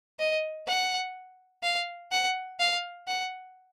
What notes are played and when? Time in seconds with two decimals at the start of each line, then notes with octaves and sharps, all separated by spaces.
0.19 D#5
0.67 F#5
1.63 F5
2.11 F#5
2.60 F5
3.08 F#5